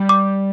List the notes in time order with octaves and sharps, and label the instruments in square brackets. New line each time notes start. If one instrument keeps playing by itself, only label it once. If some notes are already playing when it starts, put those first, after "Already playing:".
Already playing: [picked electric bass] G3
[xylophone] D6